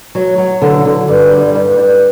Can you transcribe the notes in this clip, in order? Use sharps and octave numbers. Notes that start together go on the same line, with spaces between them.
F#3
F#3
D3
D3
G2
G3
G2
G2